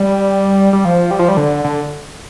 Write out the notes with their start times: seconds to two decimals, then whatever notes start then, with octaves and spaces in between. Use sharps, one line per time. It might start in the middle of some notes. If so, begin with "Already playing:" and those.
Already playing: G3
0.73 G3
0.85 F3
1.11 G3
1.19 F3
1.28 G3
1.37 D3
1.64 D3